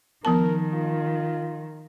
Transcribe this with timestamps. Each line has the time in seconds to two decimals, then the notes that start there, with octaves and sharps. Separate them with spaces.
0.25 D#3 F3 B3 A#4 A5
0.74 F4